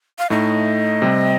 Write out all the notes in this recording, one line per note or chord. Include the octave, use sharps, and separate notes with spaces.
F5
A2 A3 D#4 D#5
C3 G3 C4